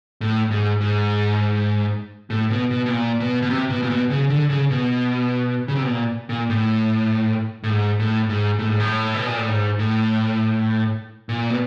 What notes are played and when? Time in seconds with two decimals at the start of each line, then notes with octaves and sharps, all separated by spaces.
0.21 A2
0.51 G#2
0.81 G#2
2.30 A2
2.50 B2
2.71 B2
2.86 B2
2.90 A#2
3.20 B2
3.42 B2
3.50 C3
3.70 B2
3.83 A#2
3.90 B2
4.10 C#3
4.30 D3
4.49 C#3
4.70 B2
5.68 C#3
5.75 C3
5.83 B2
5.90 A#2
6.29 A#2
6.50 A2
7.63 A2
7.70 G#2
8.00 A2
8.29 G#2
8.59 A2
8.69 G#2
8.80 A2
9.14 B2
9.26 A#2
9.37 A2
9.49 G#2
9.79 A2
11.29 A#2
11.50 B2